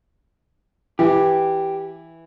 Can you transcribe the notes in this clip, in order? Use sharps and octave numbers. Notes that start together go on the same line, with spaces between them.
E3 E4 G4